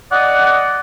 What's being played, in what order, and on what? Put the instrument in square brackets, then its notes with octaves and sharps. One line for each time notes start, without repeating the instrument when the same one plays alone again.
[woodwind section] D5 D#5 F#5